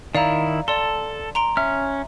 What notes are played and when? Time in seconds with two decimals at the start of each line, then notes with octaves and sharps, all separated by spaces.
0.15 D#3 E4 D5 F5 A#5
0.68 A4 D5 C6
1.35 A#5 C6 D7
1.57 C#4 E5 F6